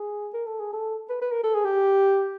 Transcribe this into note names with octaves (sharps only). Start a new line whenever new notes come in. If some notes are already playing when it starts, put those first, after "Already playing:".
Already playing: G#4
A#4
A4
G#4
A4
B4
B4
A#4
A4
G#4
G4